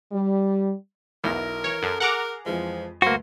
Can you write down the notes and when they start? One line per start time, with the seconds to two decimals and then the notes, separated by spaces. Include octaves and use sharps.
0.12 G3
1.24 B1 E2 E4 A#4 A#6
1.64 E3 C#5
1.83 F#2 A4
2.00 G#4 A#4 F#5 A#5 D6
2.46 F2 E3 F3 G#3
3.02 D2 G2 A#3 F#4 C5